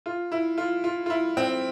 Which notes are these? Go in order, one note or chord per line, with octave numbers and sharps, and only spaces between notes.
F4
E4
F4
F4
F4
E4
C4